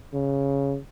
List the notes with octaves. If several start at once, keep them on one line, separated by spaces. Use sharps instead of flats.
C#3